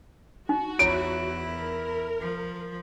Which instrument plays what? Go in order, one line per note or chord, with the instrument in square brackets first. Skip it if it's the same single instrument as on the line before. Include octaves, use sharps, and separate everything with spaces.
[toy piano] D#4 [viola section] F#4
[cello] E2 E4 [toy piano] F4 C#5 A#5 [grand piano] D7
[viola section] A#4
[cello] F3